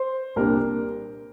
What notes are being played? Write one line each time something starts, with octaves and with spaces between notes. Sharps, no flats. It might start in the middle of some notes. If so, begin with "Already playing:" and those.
Already playing: C5
C2 A#2 G3 A#3 D4 A#4